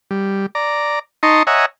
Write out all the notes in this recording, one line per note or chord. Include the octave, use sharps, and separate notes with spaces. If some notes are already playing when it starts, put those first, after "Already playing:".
G3
D5 A#5
D#4 D#5 A5 A#5 C6 C#6
C#5 D#5 E5 F#5 G#5 A#5